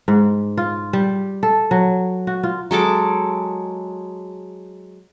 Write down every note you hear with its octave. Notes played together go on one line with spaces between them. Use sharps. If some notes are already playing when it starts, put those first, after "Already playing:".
G#2
F4
G3
A4
F#3
F#4
F4
F#3 G#3 A4 D6